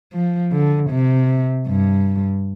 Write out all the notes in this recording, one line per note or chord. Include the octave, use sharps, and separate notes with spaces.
F3
D3
C3
G2